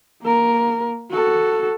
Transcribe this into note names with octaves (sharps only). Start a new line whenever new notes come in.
A#3 A#4
F#4 A4